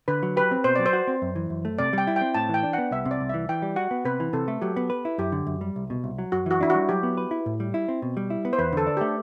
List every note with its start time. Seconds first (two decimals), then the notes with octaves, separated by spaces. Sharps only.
0.08 D3 B4
0.23 F#3
0.37 G4 B4
0.51 C4
0.64 B2 C5
0.76 F#3 D5
0.86 C5
0.93 F#4
1.07 C4
1.22 F#2
1.36 E3
1.50 F#2
1.65 A3
1.78 C3 D5
1.93 G3 G5
2.07 E4
2.16 G5
2.21 C4
2.34 A2 A5
2.49 E3
2.54 G5
2.63 D4
2.73 B3 F#5
2.91 C2 E5
3.05 C3
3.11 D5
3.21 C2
3.29 E3 E5
3.49 E3 G5
3.62 G3
3.76 F#4 F#5
3.91 B3
4.05 C3 B4
4.20 E3
4.33 C3 A4
4.48 A3
4.62 F#3 G4
4.77 B3
4.90 B4
5.05 E4
5.18 F#2 G4
5.32 D3
5.47 F#2
5.61 G3
5.76 C2
5.90 B2
6.04 C2
6.18 F#3
6.32 F#2 F#4
6.46 E3 F#4
6.61 D4 E4
6.70 G3 F#4
6.89 F#3 G4
7.03 B3
7.17 B4
7.31 E4
7.46 A2
7.60 G3
7.74 E4
7.88 C4
8.02 B2
8.17 G3
8.30 E4
8.45 B3
8.53 C5
8.59 E2 B4
8.73 D3 A4
8.87 D4
8.97 A3 G4